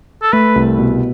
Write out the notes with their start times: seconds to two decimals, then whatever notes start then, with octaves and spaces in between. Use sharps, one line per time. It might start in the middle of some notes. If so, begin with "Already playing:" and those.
0.22 A4
0.33 A3 B4
0.56 C2
0.79 B2